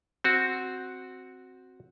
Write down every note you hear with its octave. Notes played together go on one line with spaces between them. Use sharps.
C4 F#4